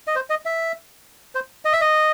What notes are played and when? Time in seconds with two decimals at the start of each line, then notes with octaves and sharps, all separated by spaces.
0.07 D#5
0.15 C5
0.30 D#5
0.45 E5
1.35 C5
1.65 D#5
1.73 E5
1.81 D#5